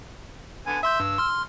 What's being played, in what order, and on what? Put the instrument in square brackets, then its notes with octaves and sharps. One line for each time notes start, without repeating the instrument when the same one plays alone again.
[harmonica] D3 B3 G#5
[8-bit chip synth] E5 C6 G6 [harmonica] E6
[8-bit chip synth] G2
C6 F6